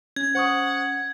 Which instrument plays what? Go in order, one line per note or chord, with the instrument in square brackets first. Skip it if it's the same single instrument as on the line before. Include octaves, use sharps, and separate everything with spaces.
[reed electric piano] C#4 [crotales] G#6
[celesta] C5 C#6 D#6 [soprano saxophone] F#5